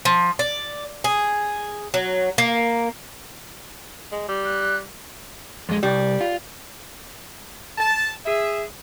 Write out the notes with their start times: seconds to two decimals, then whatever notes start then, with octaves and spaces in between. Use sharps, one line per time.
0.05 F3
0.39 D5
1.04 G#4
1.94 F#3
2.38 A#3
4.12 G#3
4.28 G3
4.45 F#6
5.69 F2 G#3
5.83 C2 G3
6.21 F4
7.78 A5
8.26 G#4 E5